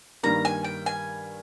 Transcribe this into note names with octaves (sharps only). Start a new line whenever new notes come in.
G2 D#3 G3 A#3 A#5
G#5
G5
G#5